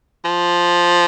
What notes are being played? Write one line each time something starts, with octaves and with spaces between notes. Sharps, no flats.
F3